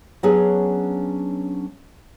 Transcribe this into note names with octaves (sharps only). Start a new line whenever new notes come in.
F#3 B3 C#4 D4 G#4